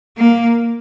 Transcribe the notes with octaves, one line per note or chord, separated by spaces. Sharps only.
A#3